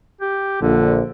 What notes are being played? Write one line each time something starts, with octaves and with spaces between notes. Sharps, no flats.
G4
A#1 D3